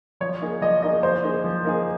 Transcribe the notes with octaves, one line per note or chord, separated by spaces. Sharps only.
F3 C#5
A#3 D#4 G#4
F3 D#5
A#3 D#4 G#4 D#5
F3 C5
A#3 D#4 G#4
F3
A#3 D#4 G#4